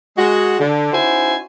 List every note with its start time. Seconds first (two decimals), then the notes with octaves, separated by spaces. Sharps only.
0.18 G#3 F#4
0.59 D3
0.93 C#4 D#4 E4 F#4 C5 G#5